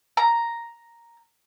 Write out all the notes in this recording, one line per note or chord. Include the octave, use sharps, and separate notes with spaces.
A#5